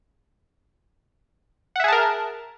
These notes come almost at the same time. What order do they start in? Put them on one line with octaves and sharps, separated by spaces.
F#5 E5 G#4 A5 A#4